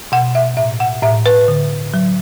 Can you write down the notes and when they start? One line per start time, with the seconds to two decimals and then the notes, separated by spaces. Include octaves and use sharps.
0.12 B2 F#5
0.35 E5
0.57 A2 E5
0.80 F#5
1.03 A2 E5
1.26 B4
1.48 D3
1.94 F#3